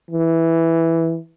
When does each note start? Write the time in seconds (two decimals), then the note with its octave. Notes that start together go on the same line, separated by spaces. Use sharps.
0.11 E3